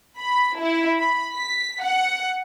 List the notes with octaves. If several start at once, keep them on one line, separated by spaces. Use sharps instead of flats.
B5
E4
B5
B6
F#5